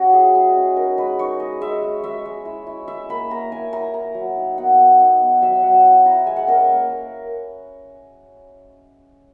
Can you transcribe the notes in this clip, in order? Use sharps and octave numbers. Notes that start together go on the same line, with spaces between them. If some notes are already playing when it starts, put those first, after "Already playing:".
Already playing: C#4 F#4
E4 G#4
G#3 G#4
C#4
D#4 A#4
G#3 B4
D#4 C#5
G#3 D#5
G#3 E5
G#3
G#3 E5
G#3
E4
E4
E4 E5
A#3 B5
A#3 A#5
E4 G#5
E4 A#5
A#3 A#5
F#3
D#4
B3 F#5
B3
D#4
B3
F#3 E5
F#3 F#5
E4
E4 A#5
G#3 G#5
F#5
C#4 A#4
A#3
A#3